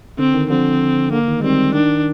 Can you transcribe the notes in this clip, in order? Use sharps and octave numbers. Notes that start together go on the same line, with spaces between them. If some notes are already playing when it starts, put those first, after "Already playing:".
D3 C4
D#3
D3 F3 C4
D3 A#3
D#3
G#3
D#3 G3 C4
D#3 D4